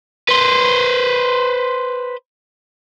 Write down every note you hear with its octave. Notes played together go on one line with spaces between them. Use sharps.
B4 C5